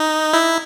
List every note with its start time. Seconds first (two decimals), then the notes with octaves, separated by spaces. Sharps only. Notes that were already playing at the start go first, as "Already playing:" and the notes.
Already playing: D#4
0.33 E4